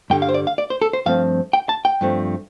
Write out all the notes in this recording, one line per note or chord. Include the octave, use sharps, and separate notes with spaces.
G2 D3 G3 G5
F5
C5
D5
F5
D5
C5
A4
C5
G2 F3 A3 C4 F5
G5
A5
G5
G2 F3 A3 C4